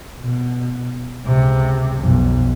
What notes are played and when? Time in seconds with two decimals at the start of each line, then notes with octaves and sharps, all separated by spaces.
0.19 B2
1.25 C#2 C3
1.99 B1 F2